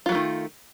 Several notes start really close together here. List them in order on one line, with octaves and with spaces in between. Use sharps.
F4 F#3 A3 D#3